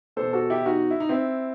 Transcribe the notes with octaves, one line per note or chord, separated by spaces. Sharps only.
E2 B2 A4 C5
F#4 A4
E4 G4
D#4 F#4
E4
D#4
C4 E4